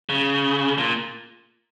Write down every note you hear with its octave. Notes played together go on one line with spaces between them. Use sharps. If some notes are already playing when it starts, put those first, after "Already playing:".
C#3
A#2